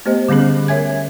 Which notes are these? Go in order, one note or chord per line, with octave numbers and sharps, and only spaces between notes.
A3 B3 G4 C5 D#5
D3 G3 B3 C#4 G#4
A#4 C#5 E5 G#5 G#6